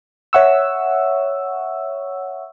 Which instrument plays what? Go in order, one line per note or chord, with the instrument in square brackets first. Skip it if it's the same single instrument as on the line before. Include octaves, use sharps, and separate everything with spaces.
[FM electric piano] C#5 E5 F#5 C#6 E6